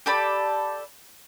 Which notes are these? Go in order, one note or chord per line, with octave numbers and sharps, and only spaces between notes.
G4 A4 D5 B5